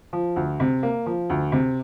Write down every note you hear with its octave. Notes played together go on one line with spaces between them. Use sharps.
F3
D2
C3
A#3
F3
D2
C3